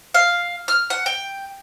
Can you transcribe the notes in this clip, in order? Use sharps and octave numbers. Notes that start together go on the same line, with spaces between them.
F5
F6
F#5
G5